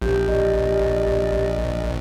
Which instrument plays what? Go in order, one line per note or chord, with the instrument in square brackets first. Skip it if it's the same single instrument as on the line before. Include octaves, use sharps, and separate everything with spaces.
[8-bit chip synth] A#1 [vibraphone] G4
[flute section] D5 D#5